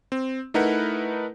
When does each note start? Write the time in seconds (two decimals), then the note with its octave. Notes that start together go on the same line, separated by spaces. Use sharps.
0.12 C4
0.54 A3 D#4 E4 A#4 B4 F#5